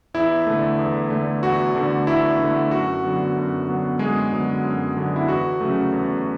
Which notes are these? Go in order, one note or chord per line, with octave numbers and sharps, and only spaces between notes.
E2 E4
D3 A3
E2
D3 A3
E2 F#4
D3 A3
E2 E4
D3 A3
F#2 F#4
D3 F#3 B3
F#2
D3 F#3 B3
F#2 G#3 G#4
D3 F#3 B3
F#2
D3 F#3 B3
E4
E2 F#4
C#3 F#3 A3
E2